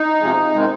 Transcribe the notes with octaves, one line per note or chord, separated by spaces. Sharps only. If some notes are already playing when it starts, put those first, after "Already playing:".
Already playing: D#4
C3 F3 G#3
C3 D#3 G#3